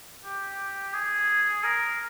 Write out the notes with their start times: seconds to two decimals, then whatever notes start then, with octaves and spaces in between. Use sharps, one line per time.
0.25 G4
0.94 G#4
1.64 A#4